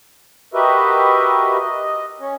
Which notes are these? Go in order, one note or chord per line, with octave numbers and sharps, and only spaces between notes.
F#4 G4 A#4 B4 D#5 E5
D#5
C#4